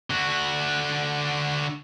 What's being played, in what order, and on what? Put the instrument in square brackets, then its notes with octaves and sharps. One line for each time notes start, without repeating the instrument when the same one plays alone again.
[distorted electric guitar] D3 F#4